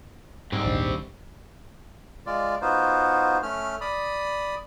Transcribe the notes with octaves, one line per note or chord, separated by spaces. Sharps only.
G#2 G3 C4
A#1 D#2 D4
G#3 F4 D5
B3 D#4 F4 F#4 C5
A3 C#4 F6
D5 B5 D#6